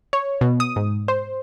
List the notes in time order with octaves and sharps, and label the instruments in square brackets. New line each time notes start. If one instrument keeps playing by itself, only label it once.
[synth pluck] C#5
B2
D#6
G#2
C5